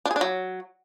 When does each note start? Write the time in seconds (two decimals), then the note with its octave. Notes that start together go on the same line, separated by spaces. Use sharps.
0.05 D4
0.11 G#4
0.16 D4
0.21 F#3